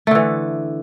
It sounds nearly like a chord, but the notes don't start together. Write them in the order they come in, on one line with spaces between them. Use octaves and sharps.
A3 D3 E3